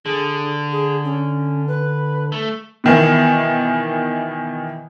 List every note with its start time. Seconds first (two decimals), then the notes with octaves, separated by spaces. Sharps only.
0.06 D3 G#4
0.72 G#4
1.04 C#4
1.68 B4
2.32 A3
2.84 B2 D#3 E3